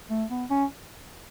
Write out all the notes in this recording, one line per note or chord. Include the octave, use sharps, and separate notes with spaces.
A3
B3
C#4